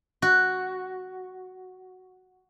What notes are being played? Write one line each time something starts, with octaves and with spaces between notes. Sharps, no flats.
F#4